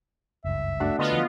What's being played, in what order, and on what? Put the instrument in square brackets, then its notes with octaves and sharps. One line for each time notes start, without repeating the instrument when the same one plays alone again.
[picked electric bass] F#1 C#2 G2 [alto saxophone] E5
[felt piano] A3 D4 F#4
[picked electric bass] D3 [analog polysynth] B3 F4 [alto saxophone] D#5
[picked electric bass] D3 E3 F3